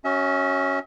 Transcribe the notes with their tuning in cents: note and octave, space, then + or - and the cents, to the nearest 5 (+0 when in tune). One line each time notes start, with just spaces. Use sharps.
C#4 +0 F#4 +30 E5 -35